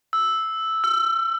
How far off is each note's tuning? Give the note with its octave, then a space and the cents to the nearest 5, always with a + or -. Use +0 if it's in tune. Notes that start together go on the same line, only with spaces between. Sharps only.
E6 -5
E6 +35